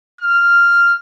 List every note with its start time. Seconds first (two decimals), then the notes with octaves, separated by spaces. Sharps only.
0.21 F6